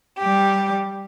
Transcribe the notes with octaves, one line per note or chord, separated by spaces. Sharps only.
G3 G4